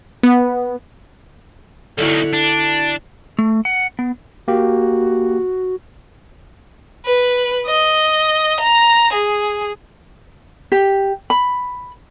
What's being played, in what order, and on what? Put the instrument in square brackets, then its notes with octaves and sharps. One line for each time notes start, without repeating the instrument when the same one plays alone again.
[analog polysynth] B3
[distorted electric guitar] B1 D#3 [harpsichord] D3 E4 F#4
[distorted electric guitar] D4
[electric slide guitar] A3
F#5
B3
[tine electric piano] A#3 G4 [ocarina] F#4
[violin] B4
D#5
A#5
G#4
[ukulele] G4
B5